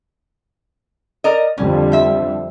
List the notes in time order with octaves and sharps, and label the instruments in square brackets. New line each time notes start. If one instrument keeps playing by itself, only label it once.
[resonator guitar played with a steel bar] A#4 D5 D#5
[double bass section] F2 D3 G3 [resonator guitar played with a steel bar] C#4
[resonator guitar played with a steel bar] C5 E5